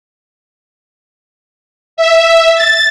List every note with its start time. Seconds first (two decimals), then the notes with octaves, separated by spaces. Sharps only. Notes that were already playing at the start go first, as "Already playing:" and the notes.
1.97 E5
2.55 A6